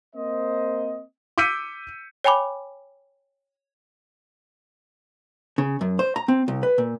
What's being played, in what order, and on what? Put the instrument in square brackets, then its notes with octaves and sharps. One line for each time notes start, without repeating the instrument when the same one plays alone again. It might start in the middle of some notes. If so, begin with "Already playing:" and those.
[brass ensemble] A#3 C4 C5 D#5
[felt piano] D6 E6 G6 B6 C#7 D#7
[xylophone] C#5 G5 G#5 B5 D6
[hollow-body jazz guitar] C#3
F#2
C5
A#5
C4
C2
B4
A#2